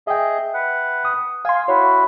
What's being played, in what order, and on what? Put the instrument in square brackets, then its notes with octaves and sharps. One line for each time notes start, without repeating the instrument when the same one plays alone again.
[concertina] G#4 D#5 [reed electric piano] E5 G5
[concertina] B4 F#5
[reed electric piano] D#6
[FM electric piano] F5 C6 [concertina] G#5
[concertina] E4 F#4 [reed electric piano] C#5